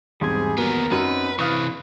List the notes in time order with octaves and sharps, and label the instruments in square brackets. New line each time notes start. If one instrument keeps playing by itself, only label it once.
[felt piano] E1 G#2 C4 [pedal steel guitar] G3 G#5 [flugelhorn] G#4
[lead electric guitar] D#2 B3 [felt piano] F#3 [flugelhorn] A#4
[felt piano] F#2 F#4 [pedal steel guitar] C4 C#4 D#4 [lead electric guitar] B4
[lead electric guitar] C3 E3 [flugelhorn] B4 [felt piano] F5 D#6 F6 [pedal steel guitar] C#6 F#6